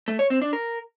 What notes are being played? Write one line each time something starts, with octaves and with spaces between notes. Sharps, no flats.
A3
C#5
C4
D4
A#4